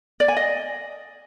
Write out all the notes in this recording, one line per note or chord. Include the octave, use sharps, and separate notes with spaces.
D5
G#5
D#5